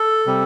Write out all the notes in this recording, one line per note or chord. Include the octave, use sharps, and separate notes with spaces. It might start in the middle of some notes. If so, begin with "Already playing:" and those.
Already playing: A4
C3 G3